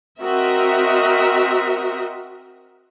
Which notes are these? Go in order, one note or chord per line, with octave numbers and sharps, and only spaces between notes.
C4 F#4 A#4 D#5 E5